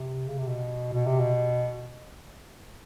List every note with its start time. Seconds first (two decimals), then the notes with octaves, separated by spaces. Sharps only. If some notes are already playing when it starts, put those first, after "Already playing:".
Already playing: C3
0.27 C#3
0.38 C3
0.47 B2
0.93 B2
1.06 C3
1.19 B2